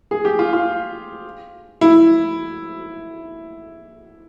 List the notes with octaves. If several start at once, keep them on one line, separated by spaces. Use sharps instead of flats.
G#4
G4
F4
F4
E4